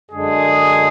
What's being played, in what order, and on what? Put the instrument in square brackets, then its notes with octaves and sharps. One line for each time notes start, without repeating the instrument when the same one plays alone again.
[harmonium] F#2 D3 G#3 D4 [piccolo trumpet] G#4